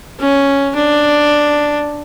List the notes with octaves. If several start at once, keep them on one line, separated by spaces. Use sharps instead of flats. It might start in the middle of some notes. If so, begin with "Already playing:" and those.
C#4
D4